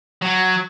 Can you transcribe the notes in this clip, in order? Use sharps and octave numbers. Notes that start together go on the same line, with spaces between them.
F#3